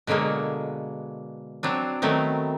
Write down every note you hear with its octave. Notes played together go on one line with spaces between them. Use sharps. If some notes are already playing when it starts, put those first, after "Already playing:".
B2 D3 F#3 G#3 A#3
F#3 C4 D4
D#3 F#3 A3 B3 C4